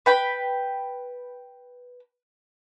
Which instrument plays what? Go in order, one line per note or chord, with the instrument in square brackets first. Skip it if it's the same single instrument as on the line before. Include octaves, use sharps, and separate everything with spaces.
[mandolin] B4 G5 B5